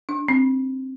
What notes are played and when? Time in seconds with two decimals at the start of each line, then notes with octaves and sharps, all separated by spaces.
0.09 D4
0.28 C4